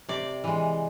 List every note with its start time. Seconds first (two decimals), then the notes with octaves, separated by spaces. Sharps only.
0.09 C3 D5
0.44 E3 G#3